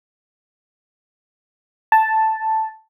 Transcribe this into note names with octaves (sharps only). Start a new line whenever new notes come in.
A5